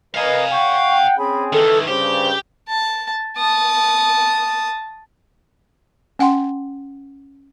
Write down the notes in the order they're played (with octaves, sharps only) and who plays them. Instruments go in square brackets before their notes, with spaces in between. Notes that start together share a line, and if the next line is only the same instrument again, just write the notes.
[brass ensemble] A#4 B4 D#5 [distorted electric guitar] F5 G#5
[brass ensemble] F#5 G5 [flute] C#6
[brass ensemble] C4 C#4 G#4 [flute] B5
[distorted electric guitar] D#3 E3 [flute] A4
[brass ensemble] C2 G2 C#3 [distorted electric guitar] G4 [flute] C5
[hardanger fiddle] A5
A5 D#6
[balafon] C#4 F#5 G5 C6